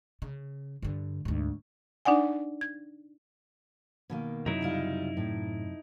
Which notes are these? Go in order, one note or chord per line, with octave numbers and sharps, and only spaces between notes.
C#3
G2 D3
D2 G#2
D4 D#4 D5 F#5 G#5
G#6
B2 D#3 A#3
F#2 C3 F#3 D#4 E4
C#3 G3 F4
A2